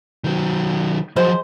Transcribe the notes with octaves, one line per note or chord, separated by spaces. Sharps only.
D#3 F#3
F3 F#3 G#3 C5